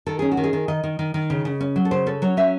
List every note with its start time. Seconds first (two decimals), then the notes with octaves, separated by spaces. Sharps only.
0.06 D#3 A4
0.19 C#4 G#4
0.32 F#4
0.37 D#3
0.44 G#4
0.53 D#3
0.68 D#3 D#5
0.84 D#3
0.99 D#3
1.14 D#3
1.30 C#3
1.45 C#3
1.61 C#4
1.76 F#3
1.85 A4
1.91 C#3 C5
2.06 C#4 A4
2.22 F#3 C#5
2.37 C#4 E5